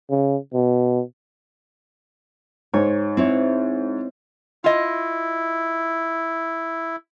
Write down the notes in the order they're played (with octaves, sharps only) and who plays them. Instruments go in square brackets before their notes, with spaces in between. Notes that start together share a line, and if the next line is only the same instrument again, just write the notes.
[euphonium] C#3
B2
[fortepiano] G#2 [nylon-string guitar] C#5
[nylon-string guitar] C4 E4 C#5
[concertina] E4 [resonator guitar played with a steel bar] F4 D#5